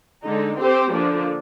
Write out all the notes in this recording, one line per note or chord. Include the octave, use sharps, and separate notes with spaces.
D3 G#3 D#4
C4 G4 C5
D3 F3 A#3 D4